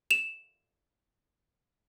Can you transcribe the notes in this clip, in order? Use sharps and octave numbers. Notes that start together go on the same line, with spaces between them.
E7 F7